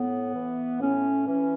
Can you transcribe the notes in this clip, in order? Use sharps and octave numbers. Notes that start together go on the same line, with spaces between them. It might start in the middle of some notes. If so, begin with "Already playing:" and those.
Already playing: A2 B3
E3
A2 C#4
E3 C#4